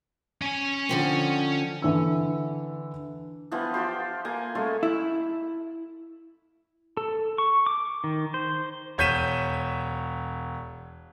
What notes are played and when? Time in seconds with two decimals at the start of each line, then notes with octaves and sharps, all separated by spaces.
0.42 C#4 G#5
0.89 D3 F3 C4
1.82 D3 E3 E6
3.52 E3 F3 B3 F4
3.74 F4 G4 C5
4.25 A#3 G#5
4.55 G#3 A3 C#4 F4
4.83 E4
6.97 A4
7.38 C#6
7.66 D6
8.04 D#3
8.34 C5
8.98 E1 C#5 G6 B6 D#7 E7